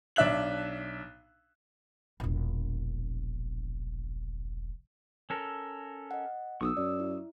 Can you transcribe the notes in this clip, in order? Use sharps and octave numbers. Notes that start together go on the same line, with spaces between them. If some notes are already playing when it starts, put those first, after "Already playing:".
B1 D4 E5 F#6 F#7
E1 A#1
C#4 A4 A#4
D#5 F#5
B1 C#6 D#6 E6
F#2 D5
E4